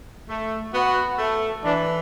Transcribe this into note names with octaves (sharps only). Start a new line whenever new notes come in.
A3
B3 F#4
A3
E3 D4